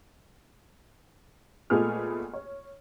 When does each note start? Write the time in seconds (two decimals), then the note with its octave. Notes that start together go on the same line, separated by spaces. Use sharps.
1.70 A#2 G#3 A3 B3 G#4 F6
2.33 C#5